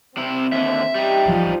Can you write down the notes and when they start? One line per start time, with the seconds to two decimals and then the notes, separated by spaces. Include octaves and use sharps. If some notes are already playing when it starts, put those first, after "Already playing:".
0.17 C3 C4 E4
0.52 D#2 D3 E5
0.95 G3 D#4 G4
1.27 F3